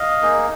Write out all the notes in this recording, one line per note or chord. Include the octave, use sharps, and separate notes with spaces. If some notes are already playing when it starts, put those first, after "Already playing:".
Already playing: D#5 F5
A#3 D#4 G#4